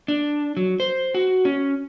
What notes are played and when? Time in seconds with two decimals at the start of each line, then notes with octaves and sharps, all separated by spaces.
0.08 D4
0.57 F#3
0.80 C5
1.14 F#4
1.45 C#4